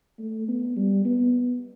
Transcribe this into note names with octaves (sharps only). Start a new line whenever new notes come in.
A3
B3
G3
B3